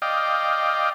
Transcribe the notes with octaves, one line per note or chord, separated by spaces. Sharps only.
D5 D#5 F5 G5